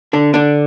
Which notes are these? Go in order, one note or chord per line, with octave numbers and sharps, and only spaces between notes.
D3 D4
D3 D4